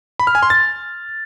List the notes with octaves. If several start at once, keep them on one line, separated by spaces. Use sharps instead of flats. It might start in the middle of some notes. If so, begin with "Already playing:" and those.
B5
F6
G#5
C6
A6